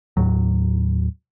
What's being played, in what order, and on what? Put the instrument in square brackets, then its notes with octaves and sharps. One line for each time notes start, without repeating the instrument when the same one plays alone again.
[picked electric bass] D#2 A2 F#3